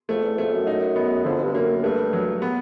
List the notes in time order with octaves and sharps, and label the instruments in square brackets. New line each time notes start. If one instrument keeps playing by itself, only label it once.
[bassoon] F2 [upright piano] A3
[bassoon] E2
[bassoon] F2 [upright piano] A3
[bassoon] F#2
[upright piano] D#4
B3
[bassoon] F2 [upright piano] D3
[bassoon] G2
[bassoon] F#2 [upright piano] A#3
[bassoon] G2 [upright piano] A3
[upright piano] F#3
B3